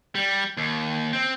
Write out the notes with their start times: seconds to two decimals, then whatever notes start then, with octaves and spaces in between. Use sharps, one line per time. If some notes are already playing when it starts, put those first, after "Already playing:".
0.15 G3
0.57 D#2
1.13 C4